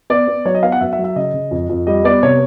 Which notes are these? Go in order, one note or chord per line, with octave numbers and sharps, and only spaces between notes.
B3 D5
B3
F#3 C#5
D#5
B3 F5
F#5
F#2 E5
E5
F#3
E5
C#3 D#5
C#3
F2
F2
G3 D#5
B3 D5
C3 C#5